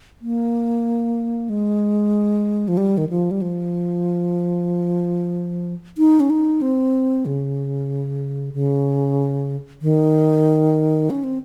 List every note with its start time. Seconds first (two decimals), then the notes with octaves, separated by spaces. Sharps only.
0.21 A#3
1.49 G#3
2.68 F3
2.77 G3
2.98 D#3
3.09 F3
3.31 G3
3.42 F3
5.98 D#4
6.20 C#4
6.30 D#4
6.62 C4
7.26 C#3
8.54 C#3
9.82 D#3
11.10 C#4
11.24 C4